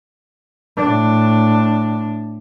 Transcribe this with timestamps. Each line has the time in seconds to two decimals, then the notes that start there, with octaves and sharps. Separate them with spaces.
0.77 A2 D4